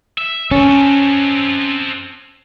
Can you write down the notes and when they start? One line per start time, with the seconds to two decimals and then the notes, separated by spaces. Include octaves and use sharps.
0.18 E5
0.51 C4 C#4 A4